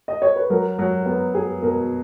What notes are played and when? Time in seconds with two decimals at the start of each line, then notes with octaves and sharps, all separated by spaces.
0.08 D#5
0.22 C#5
0.36 B4
0.50 F#3 A#4
0.79 F#3
1.06 B3
1.34 B3 G#4
1.63 B2 A#4